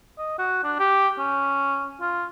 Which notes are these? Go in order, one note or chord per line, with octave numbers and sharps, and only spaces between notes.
D#5
F#4
D4
G4
C#4
F4